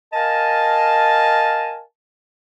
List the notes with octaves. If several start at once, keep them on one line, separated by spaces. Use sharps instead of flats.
A#4 D#5 F5 G#5 A5